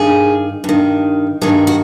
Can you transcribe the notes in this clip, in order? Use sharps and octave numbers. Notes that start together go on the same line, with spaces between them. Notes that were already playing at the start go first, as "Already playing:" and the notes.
Already playing: G2 D#3 G#4
G2 D#3
G2 D#3 G#4
F#4